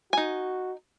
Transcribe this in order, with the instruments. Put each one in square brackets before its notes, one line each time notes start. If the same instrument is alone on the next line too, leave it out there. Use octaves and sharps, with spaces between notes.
[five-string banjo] D#4 G#5 [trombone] F#4